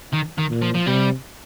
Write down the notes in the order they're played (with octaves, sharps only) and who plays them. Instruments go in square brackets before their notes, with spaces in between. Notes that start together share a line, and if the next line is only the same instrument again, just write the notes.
[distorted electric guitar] D#3
D#3
[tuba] A#2
[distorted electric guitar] F3
F3
[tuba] C3 [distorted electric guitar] G3